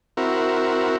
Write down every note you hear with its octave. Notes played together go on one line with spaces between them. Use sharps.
C4 E4 F#4 A#4